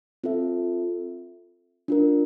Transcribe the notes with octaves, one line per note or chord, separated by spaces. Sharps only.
C4 F4 A4 E5
D4 F4 A#4